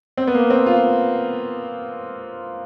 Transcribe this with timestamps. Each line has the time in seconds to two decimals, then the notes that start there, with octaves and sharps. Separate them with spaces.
0.17 C4
0.27 B3
0.34 A#3
0.50 C4
0.66 F4